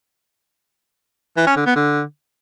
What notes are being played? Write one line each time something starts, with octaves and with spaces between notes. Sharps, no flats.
E3
C#4
D3
B3
D3